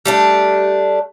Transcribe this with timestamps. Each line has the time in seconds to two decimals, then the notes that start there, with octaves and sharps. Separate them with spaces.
0.06 G3 A3 D4